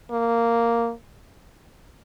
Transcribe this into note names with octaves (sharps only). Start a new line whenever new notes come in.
A#3